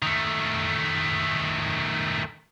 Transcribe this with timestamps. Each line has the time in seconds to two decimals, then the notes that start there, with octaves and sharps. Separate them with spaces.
0.03 D#3 A3